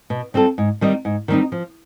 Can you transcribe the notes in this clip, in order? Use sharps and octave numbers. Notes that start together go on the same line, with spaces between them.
B2
G3 C4 F4 A4
G#2
D#3 G3 C4 D#4
G#2
D#3 G3 C4 D#4
F3